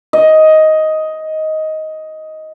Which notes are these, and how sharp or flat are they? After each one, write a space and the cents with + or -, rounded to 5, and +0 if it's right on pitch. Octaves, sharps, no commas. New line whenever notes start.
D#5 +10